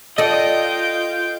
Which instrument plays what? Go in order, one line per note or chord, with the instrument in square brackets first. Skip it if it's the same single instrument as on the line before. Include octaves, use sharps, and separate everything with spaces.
[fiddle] F4 G5 [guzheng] A4 D5 [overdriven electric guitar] D#5